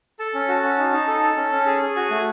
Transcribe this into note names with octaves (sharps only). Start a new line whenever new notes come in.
A4 A5
C#4
F#4
C#4
D#4
D#4
A4
A4
C#4
C#4
G#4
G#4
F#4 G#5
A3